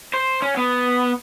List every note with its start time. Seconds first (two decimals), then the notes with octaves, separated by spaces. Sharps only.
0.14 C5
0.42 C#4
0.57 B3